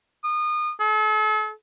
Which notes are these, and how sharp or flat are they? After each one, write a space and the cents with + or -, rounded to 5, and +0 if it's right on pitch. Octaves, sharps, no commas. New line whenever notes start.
D#6 -30
A4 -40